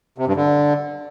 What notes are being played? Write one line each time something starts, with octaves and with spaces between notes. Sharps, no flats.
C3
G2
D3